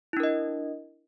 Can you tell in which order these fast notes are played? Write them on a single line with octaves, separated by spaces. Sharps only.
E4 D4 A#4 D#5